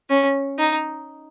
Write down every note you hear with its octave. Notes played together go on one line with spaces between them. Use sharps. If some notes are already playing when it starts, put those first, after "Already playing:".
C#4
D#4